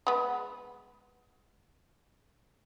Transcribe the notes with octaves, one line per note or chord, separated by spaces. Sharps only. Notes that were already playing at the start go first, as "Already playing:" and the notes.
G#3 B3